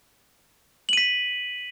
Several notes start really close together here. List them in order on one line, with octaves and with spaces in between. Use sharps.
F#7 D#7 B6